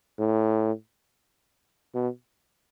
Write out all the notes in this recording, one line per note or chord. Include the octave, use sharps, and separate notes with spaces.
A2
B2